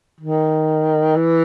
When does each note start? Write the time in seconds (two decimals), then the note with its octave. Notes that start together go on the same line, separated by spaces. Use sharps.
0.20 D#3
1.16 E3